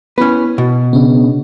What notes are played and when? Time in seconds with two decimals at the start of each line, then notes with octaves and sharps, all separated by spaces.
0.18 B3 C#4 E4 B4
0.58 B2
0.93 C#3 B3 C#4 D4